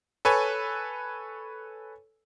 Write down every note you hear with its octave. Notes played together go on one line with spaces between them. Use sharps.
A4 B4 C#5 G#5